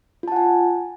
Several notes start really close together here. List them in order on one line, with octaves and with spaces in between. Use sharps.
F4 A5 F#5 G#5